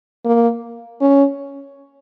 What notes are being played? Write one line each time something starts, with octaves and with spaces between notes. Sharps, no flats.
A#3
C#4